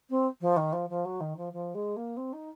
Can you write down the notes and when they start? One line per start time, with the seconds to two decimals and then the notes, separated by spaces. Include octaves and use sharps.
0.09 C4
0.41 F3
0.56 D#3
0.72 F3
0.89 F3
1.05 F#3
1.20 D#3
1.37 F3
1.53 F3
1.74 G#3
1.96 A#3
2.17 C4
2.32 D#4